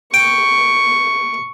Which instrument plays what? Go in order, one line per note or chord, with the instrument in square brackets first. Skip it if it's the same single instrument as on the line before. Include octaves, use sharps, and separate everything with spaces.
[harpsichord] G5 [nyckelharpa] C#6